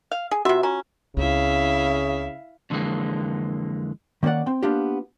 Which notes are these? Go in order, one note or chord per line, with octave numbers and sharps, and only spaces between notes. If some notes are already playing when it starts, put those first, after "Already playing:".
F5
G#4
C3 F4 F#4 E5 F#5
C#4 A#5
C#2 C#3 C4 E4 E5 F5
F2 D3 E3 F#3 G#3 A#3
D#3 A#3 C#4 D5 F#5
C4 G5
A#3 B3 D4 F4 G4